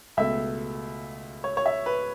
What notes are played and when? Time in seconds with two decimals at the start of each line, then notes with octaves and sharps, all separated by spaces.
0.17 C#2 B2 A3 E5
1.44 C#5
1.57 C#5
1.66 E5
1.86 B4